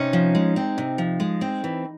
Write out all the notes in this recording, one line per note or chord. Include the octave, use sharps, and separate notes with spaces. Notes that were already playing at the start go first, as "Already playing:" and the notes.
Already playing: C3 C#4 D#4
F3
G#3
C4
C3
F3
G#3
C4
E3